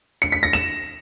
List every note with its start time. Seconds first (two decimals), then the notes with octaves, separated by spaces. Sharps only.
0.22 C#7
0.32 B6
0.43 A#6
0.53 E7